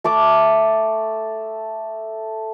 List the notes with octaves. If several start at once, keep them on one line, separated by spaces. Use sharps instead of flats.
A3 A4 D6